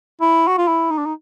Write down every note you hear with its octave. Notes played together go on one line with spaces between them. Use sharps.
E4
F#4
F4
E4
D#4
D4
D#4